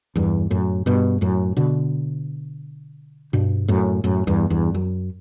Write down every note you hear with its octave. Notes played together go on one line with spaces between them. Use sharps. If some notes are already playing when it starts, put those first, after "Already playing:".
E2 G2
F#2 A2
G2 B2
F#2 A2
B2 D3
G2 B2
F#2 A2
F#2 A2
E2 G2
E2 G2
F#2